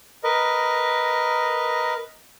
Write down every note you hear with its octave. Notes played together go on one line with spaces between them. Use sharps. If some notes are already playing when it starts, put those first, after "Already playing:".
A#4 B4 D#5